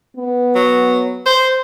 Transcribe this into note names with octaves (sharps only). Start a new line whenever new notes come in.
B3
F#3
C5